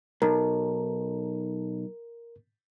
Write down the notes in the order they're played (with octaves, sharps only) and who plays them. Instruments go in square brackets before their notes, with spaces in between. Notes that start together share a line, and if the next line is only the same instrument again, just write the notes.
[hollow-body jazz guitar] B1 [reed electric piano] A#4